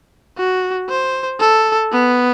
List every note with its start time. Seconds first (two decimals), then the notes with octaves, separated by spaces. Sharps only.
0.37 F#4
0.89 C5
1.39 A4
1.92 B3